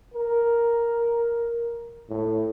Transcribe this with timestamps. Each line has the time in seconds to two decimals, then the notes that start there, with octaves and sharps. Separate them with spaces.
0.14 A#4
2.09 A2